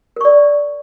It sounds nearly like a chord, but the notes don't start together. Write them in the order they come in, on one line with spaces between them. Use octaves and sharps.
A#4 C#6 D5